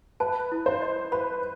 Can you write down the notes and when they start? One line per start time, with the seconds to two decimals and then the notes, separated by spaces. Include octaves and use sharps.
0.20 B4 A5
0.52 E4
0.66 C5
0.82 D#5
1.12 B4 B5